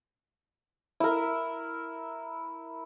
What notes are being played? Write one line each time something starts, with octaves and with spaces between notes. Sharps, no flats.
E4 A#4